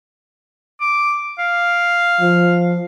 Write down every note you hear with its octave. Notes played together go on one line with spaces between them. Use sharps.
D6
F5
F3